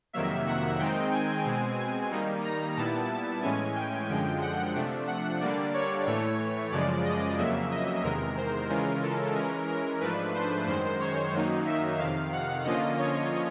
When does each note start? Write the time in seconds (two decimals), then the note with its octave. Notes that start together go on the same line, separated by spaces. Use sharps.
0.13 F2 C3 D#3 F#3 A#3 E5
0.47 F#5
0.79 D#3 G#3 C4 D#4 G5
1.13 G#5
1.45 B2 G#3 C4
1.78 G#5
2.11 D#3 G3 A#3 D#4
2.44 A#5
2.77 A#2 G3 B3 E4 A5
3.10 A5
3.42 A2 E3 G#3 C#4 G#5
3.75 G5
4.09 F#2 D3 F3 G#3 G5
4.42 F#5
4.74 C3 F3 A3 D4
5.07 F#5
5.40 D3 G3 A#3 D4 D5
5.74 C#5
6.06 A2 E3 A3 C#5
6.72 F#2 C#3 F3 G#3 D5
7.05 D#5
7.38 F2 C#3 F#3 A#3 E5
7.71 D#5
8.03 E2 C3 D#3 G#3 A#4
8.37 C5
8.69 C#3 E3 G#3 C#4 F4 A#4
9.03 A4
9.35 E3 G#3 C#4 A#4
9.68 A#4
10.01 G#2 F3 A3 D4 B4
10.34 C5
10.67 F#2 D#3 G#3 C5
11.00 C#5
11.33 F#2 D#3 F#3 A#3 D#4
11.66 E5
11.98 F2 C3 D#3 F5
12.32 F#5
12.64 D3 F3 A#3 C#4 F4 D#5
12.98 C#5